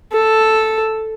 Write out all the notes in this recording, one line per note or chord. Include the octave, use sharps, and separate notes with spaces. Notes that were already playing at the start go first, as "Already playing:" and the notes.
A4